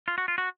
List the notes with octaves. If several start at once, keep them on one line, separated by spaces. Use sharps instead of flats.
F4
F#4
F4
F#4